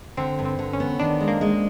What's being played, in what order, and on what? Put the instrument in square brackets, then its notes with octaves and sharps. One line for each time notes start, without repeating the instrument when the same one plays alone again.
[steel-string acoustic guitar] D3 [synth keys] C4
[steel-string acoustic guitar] G2
[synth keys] C4
[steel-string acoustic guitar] D3
[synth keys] C#4
[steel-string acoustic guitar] B3
[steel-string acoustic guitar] D#3 [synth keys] D4
[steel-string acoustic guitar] G#3
[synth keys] A#3
[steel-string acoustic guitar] G#3